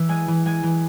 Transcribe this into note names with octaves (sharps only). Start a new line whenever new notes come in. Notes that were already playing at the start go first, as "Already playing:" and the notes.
Already playing: E3 E5
G#3 G#5
E3
G#3 G#5
E3